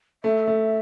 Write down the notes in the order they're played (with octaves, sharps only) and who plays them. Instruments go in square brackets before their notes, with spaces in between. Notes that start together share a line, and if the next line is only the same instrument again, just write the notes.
[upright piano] A3 [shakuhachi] E5
[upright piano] A3